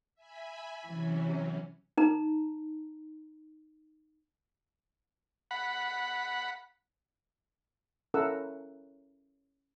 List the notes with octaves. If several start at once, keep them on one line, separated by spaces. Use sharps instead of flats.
E5 G#5 B5
C3 E3 F#3 C#4
D#4 A#5
F#5 B5
C#4 E4 A4 A#4 F#5 E6